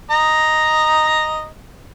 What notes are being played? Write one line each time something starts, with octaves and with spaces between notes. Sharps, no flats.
D#5 A#5